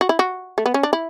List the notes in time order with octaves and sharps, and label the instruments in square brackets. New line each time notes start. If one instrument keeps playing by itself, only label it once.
[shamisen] F#4
E4
F#4
A3
B3
C#4
D4
E4